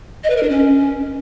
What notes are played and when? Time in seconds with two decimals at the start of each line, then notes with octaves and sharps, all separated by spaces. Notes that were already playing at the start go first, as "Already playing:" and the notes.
0.24 D#5
0.30 B4
0.37 A#4
0.43 D4
0.49 C#4